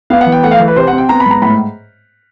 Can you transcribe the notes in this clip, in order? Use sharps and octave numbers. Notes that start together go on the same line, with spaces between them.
B3 F5
F#5
E3
G5
A3 F#5
F5
E3
B4
C3 C5
F#5
C4
G5
B3 A#5
B5
G#2 A#5
A2 B5